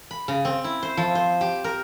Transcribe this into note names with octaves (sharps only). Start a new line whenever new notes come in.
B5
C#3
C4
E4
C5
F3
C5
G4
A#4